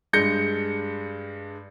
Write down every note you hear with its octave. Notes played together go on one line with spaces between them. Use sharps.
G2 G#3 G6 A#6 C#7